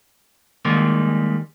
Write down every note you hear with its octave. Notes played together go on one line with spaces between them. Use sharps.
D#3 G3 G#3 A#3